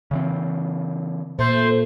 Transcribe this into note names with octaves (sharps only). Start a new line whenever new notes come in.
C#3 E3 C4
A#2 A3 C5